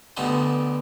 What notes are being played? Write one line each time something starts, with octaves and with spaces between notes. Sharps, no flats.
D2 G2 B2 D3 G3 A3